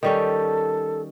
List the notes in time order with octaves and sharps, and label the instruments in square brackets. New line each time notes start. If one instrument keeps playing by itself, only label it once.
[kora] D#3 G3 C#4 [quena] A4